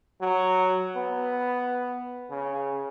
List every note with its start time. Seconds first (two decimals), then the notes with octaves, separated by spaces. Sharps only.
0.21 F#3
0.96 B3
2.30 C#3